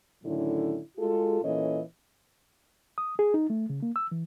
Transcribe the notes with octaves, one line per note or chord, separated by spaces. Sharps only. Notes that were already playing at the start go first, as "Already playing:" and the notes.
A2 D3 D#3 F#3 C#4 E4
G#3 F4 F#4 G#4 A4
A#2 E3 C#4 A4 C#5 D#5
D#6
G#4
D#4
A3
C#3
A#3
E6
E3